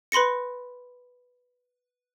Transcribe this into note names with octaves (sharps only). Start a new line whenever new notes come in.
B4 B5 C6 A#6 C#7